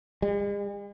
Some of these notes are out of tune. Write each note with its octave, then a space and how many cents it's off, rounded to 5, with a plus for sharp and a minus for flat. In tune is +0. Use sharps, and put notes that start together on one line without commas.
G#3 -45